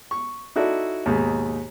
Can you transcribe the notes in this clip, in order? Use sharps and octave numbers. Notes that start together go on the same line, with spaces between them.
C#6
D#4 E4 F#4 A4 D5
D#2 G#2 B2